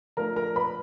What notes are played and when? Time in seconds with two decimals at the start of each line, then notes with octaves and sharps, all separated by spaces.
0.17 F3 A3 D4 A#4 A#5
0.36 A#4 A#5
0.56 B4 B5